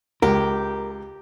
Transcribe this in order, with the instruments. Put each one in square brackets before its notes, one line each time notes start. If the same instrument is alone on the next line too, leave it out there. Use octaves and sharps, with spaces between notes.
[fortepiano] C#2 [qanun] G4 [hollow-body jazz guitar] A#4